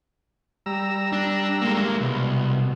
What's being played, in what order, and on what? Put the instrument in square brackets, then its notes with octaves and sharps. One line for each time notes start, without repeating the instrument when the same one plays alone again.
[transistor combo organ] G3 A#5 E6
[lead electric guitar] D4
G#3 A#3
[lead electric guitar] C2 [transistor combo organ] B2